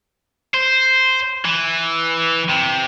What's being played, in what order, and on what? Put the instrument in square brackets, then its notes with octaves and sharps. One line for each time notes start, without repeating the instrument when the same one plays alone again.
[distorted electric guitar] C5
E3
C3